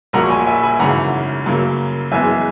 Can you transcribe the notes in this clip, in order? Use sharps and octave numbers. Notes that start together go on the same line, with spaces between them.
A#1 A#2 F#3 A#3 F#5 A#5
C#6
G#5 B5
E5 G#5
G#5 B5
G#1 F#2 C#3 E3 F#5 A#5
F#2 C#3 F#3 A#3
F#1 F#2 E3 G#3 B3 E5 G#5